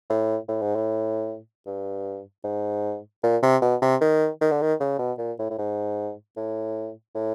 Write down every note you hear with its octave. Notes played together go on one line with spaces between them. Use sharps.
A2
A2
G#2
A2
G2
G#2
A#2
C3
B2
C3
D#3
D#3
D3
D#3
C#3
B2
A#2
A2
A2
G#2
A2
A2